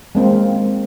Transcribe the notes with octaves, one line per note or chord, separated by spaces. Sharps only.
G#3 A#3 C4